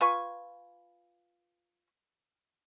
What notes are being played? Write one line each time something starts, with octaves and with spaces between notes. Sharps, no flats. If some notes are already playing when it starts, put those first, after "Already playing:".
F4 B4 G#5 C#6